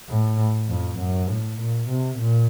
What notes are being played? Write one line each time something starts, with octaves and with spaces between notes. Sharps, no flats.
A2
F2
F#2
A2
A#2
C3
A#2